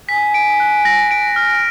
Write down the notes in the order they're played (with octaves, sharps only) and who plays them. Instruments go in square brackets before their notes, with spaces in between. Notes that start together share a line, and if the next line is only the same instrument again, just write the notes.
[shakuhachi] G#5 [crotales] B6
[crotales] D7
F#6
A#6
D7
F6